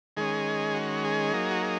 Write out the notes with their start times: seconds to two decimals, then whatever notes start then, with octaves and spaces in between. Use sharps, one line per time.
0.17 D#3 G#3 C#4 G#4
0.74 F#4
1.04 G#4
1.33 F#3 A#3 D#4
1.51 F#4
1.62 G#4